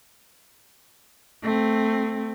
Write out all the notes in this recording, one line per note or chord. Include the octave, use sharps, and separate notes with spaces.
A3 C4